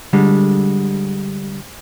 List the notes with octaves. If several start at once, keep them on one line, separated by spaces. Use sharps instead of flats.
D3 G3 G#3